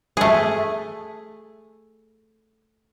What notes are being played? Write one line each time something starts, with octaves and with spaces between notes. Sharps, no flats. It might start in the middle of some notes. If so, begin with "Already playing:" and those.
A3 G#4